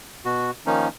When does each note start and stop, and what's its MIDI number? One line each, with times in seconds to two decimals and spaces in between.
0.25 0.51 47
0.25 0.51 66
0.66 0.88 51
0.66 0.88 53
0.66 0.88 58
0.66 0.88 61
0.66 0.88 63